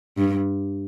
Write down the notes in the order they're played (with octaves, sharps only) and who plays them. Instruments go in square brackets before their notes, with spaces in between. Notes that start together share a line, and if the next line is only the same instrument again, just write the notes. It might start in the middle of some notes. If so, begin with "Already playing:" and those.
[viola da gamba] G2